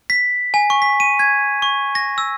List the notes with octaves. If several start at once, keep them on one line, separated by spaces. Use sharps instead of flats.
B6
G#5
C#6
B6
D#7
G#6
C#6
A#6
E6